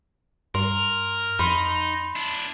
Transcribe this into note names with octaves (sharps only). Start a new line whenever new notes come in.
G2 A#4 C6
F2 D#4 B5 C6
D4 E4